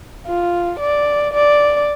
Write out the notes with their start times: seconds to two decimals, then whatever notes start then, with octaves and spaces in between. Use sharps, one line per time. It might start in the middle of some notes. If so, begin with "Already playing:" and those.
0.27 F4
0.80 D5
1.33 D5